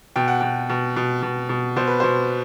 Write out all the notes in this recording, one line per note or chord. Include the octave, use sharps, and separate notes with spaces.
B2 G5
F#5
B2 G5
B2
B2
B2
B2
B2 C5
B4
B2 C5